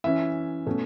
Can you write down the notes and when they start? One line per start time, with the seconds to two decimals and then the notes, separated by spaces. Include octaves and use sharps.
0.04 E3 C#4 E5
0.67 B2 A3 C#4